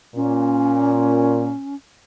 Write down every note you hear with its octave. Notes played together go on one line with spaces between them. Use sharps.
A#2 C#4